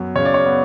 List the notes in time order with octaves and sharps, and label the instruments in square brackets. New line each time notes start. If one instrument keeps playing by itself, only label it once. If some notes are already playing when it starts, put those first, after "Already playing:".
Already playing: [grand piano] F#2 F#3 B3
C#3 C#5
D5
C#5
B3